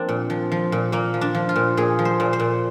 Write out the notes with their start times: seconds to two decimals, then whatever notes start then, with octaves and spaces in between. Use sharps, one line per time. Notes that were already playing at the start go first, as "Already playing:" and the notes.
Already playing: F3 A#3 C4 D4
0.09 A#2
0.30 F3
0.52 F3
0.72 A#2
0.92 A#2 A#3
1.14 F3
1.21 D4
1.35 F3
1.49 F4
1.56 A#2
1.77 A#2 G#4
1.99 F3
2.05 C5
2.20 A#2
2.33 C5
2.40 A#2